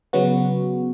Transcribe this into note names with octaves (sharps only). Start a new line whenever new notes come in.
C#3 F#3 B3 F#4